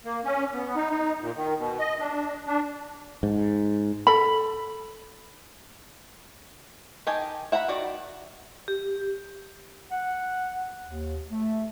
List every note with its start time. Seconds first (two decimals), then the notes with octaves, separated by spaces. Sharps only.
0.05 A#3
0.25 C#4
0.53 B3
0.76 D#4
0.90 D#4
1.21 A#2
1.36 D#3
1.58 B2
1.79 D#5
2.00 D4
2.47 D4
3.23 G#2
4.07 A4 B5
7.07 D#3 G4 D#5 G#5 A5
7.52 E5 F#5 A#5 B5
7.68 D#3 F#4 D5
8.68 G4
9.91 F#5
10.86 D#2
11.31 A3